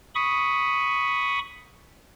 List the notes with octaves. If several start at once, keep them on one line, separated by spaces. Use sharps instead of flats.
B5 C#6 D#6